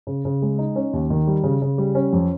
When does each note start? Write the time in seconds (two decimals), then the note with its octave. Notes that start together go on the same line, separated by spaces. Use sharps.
0.07 C#3
0.25 C#3
0.42 G#3
0.59 D#4
0.76 C#4
0.93 D#2
1.10 D#3
1.27 G3
1.44 C#3
1.62 C#3
1.78 G3
1.95 C#4
2.13 F2